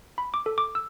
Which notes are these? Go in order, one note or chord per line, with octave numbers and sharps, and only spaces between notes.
B5
D6
A4
D6
E6